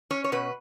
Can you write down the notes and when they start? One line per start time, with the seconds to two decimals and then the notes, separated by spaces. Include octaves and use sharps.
0.11 C#4 C#5
0.24 C#5
0.32 B2 B4